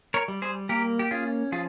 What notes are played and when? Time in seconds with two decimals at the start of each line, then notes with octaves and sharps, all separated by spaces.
0.14 A#4 C#5
0.28 G3
0.42 G#4 C5
0.69 A#3 G4 A#4
0.99 G4
1.11 C#4 F4 G#4
1.52 F3 F4 G#4